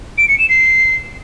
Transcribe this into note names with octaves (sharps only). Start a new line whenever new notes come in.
D7
C#7
E7
C7